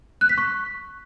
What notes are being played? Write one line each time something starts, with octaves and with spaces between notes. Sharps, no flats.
F#6
B6
C#6